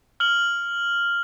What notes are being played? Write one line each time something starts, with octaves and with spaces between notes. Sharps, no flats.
F6 F#7